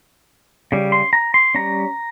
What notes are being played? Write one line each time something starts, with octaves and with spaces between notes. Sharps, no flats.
C#3 G3
C6
A#5
C6
G3 C#4 A#5